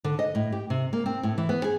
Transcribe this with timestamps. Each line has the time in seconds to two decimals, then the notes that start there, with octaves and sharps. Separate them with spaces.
0.04 D3
0.19 D#5
0.35 A2
0.52 G4
0.70 C3
0.93 A#3
1.06 C4
1.23 A2
1.38 E3
1.49 B3
1.64 G#4